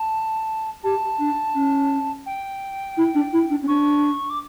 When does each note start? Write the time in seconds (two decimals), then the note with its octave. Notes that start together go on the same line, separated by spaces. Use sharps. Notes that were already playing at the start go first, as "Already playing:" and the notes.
Already playing: A5
0.84 G4 A5
1.19 D4
1.55 C#4
2.26 G5
2.97 E4
3.15 D4
3.33 E4
3.50 D4
3.63 C#4
3.68 D4 C#6
4.30 D6